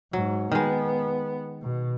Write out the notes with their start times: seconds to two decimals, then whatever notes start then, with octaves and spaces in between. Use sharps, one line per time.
0.13 G#2 F#3
0.52 D#3 G#3 B3
1.62 B2